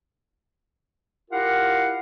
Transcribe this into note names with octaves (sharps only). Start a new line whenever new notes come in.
E4 F4 G4 A#4 F5 F#5